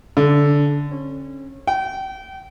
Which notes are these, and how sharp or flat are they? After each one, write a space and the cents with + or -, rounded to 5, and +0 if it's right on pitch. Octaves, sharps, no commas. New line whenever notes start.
D3 -15
C#4 -30
G5 -35